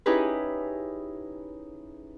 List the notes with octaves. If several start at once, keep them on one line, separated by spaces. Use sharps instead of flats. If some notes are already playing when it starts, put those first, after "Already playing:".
C#4 D#4 E4 G4 G#4 B4